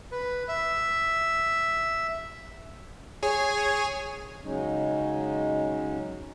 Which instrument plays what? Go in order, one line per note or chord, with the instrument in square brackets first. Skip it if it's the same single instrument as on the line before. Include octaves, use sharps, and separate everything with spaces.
[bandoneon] B4
E5
[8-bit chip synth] G#4 C#5 G#5
[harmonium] C#3 F#3 G#3 C#4 D#4